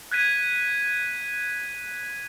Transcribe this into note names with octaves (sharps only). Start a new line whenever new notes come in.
F#6 G#6 B6 D#7